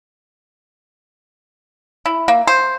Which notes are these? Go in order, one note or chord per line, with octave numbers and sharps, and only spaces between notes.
E4
A#3
C5